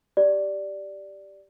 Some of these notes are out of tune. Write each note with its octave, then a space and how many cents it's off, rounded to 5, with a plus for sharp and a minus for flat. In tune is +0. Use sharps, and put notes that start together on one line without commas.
G4 +0 D5 +0